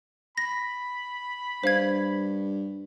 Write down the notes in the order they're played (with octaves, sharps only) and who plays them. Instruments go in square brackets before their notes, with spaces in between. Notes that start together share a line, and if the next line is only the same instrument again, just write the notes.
[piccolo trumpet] B5 [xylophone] A#6
[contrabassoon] G2 [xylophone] C5 F5 G#6